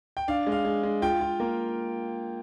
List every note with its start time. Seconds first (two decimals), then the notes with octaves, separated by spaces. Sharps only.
0.17 G5
0.28 D4 F5
0.47 G#3
0.52 F5
0.65 G#3
0.83 G#3
1.02 F4 G5
1.21 F4
1.40 A#3